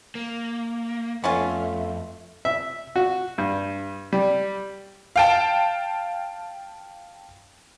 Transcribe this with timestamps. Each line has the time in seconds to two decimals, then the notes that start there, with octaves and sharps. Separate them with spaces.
0.15 A#3
1.24 F2 A3 B3 C#4 F4 E5
2.45 E5
2.96 F#4
3.38 G2
4.13 G3
5.16 F5 G5 A5